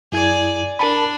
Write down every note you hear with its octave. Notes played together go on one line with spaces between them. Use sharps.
F#2 E4 G#4 D5 G#6
D4 A#4 A5 B5